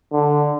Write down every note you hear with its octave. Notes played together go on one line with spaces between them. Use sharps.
D3